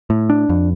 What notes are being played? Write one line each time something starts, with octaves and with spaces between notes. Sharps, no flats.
A2
D4
F2